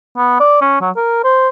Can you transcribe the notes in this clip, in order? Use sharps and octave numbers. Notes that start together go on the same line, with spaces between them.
B3
D5
C#4
F#3
A#4
C5